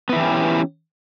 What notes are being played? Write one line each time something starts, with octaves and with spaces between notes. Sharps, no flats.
E3 B3 C#4 E4 G4